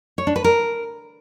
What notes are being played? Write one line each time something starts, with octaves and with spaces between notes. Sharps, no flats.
C#5
D4
B4
A#4